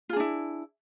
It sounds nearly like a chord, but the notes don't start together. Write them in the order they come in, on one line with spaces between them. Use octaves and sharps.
F4 G#4 D4 E4